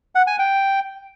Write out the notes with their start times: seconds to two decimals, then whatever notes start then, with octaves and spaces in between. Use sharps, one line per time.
0.15 F#5
0.27 G#5
0.39 G5